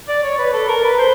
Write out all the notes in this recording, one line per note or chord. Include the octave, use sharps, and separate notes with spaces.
D5
C#5
B4
A4
A#4
B4
C5